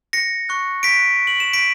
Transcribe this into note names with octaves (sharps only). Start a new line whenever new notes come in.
A#6 C#7
C#6 F#6
B6 D7
F#7
E7
B6 D7